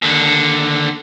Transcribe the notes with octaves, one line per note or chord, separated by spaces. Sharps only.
D#2 D3